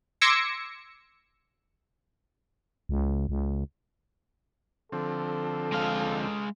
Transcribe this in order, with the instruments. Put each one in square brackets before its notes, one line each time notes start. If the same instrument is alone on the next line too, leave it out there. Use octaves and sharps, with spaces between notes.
[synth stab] C6 D6 E6 G#6 A#6 C#7
[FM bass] C#2
C#2
[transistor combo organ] D3 F3 C4 [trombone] A4
[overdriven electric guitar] G#3 F5